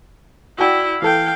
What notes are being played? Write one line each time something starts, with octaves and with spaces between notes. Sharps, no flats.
E4 F#4 D5 G5
E3 A4 F5 G5